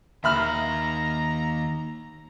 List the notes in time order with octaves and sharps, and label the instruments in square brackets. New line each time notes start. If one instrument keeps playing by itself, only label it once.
[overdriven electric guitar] D#2 D#3 [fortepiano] E5 B5 F6 [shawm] A#5